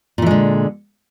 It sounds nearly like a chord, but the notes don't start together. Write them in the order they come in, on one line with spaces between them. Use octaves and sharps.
A#2 E3 G#3 D3